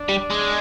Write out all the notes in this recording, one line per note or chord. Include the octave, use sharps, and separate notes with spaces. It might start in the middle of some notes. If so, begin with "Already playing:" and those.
Already playing: D4 D5
G3
G#3